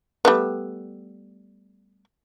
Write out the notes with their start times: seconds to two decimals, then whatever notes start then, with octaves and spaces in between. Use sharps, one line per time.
0.25 G3 A3 B3